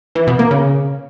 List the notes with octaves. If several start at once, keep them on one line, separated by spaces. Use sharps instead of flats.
E3
B2
A#3
C#3